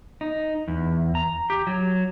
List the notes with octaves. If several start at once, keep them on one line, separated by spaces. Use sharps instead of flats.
D#4
E2
A#5
G4
F#3